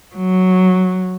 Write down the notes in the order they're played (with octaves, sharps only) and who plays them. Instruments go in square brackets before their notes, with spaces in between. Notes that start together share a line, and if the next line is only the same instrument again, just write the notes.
[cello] F#3